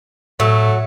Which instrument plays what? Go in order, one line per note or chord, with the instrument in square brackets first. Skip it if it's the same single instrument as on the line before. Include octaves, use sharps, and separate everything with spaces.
[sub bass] A2 [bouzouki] F#3 [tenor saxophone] A3